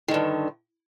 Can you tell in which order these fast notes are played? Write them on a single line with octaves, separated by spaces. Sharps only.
D#3 D3 G2